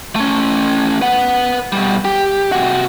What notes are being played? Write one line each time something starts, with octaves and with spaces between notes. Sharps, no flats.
A3 C#4
B4 F#5
B2 G3
G4
C3 F#4